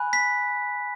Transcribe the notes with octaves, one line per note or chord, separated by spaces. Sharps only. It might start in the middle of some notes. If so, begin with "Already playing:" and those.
Already playing: G#5 B5 F#6
B6